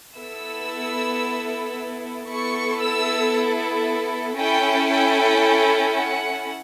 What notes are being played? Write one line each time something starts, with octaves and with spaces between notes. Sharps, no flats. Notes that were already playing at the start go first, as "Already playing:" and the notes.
B3 E4 A4 E6
B3 E4 A4 C#6
E6
C#4 E4 A4 G5
G5
F#5